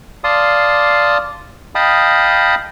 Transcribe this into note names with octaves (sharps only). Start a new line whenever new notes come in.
D5 F5 A5 C6 D#6
D#5 F5 G5 A5 B5 D#6